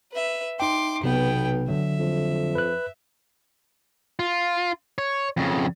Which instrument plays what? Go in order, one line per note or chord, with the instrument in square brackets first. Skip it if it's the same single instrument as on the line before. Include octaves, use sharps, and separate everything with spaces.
[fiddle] B4 E5
[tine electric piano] D#4 G5 [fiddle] C6 D6
[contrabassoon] B1 [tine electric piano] C3 [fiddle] B3 G5
[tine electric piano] D3 F#3 [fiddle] E5
[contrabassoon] F2
[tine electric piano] B4 F#6
[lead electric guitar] F4
C#5
F2 C#3